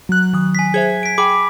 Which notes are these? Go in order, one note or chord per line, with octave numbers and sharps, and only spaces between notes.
F#3 F#6
D#3 D#6
G#5 B6
G#4 C5 E5 G#6
B6 D7
G#4 G5 B5 D6